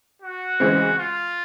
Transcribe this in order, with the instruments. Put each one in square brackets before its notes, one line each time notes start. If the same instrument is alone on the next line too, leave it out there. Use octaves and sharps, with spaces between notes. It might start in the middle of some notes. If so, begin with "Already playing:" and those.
[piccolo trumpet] F#4
[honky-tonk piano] C#3 E3 G#3 C4
[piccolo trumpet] F4